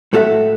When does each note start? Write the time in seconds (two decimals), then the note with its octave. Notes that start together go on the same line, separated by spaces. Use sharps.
0.13 A2 A3 F#4 A4 E5